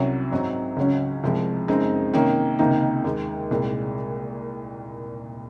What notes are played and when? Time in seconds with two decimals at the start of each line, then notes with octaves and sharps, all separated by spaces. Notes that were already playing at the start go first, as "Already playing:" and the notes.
Already playing: C2 C3 F#3 C#4
0.31 G#2 F#3 C4 D#4
0.76 C#2 C#3 F#3 C#4
1.23 C2 C3 F3 G#3
1.68 F#2 C#3 G#3 C4 D#4
2.13 C3 D#3 A#3 C#4
2.59 C#2 C3 D#3 A#3 D#4
3.04 D#2 D#3 G#3
3.51 C2 A#2 G#3